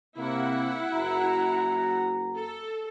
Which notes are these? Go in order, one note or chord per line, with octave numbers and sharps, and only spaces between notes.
C3 A#3 E4 F#5
F#1 F#4 A#5
A4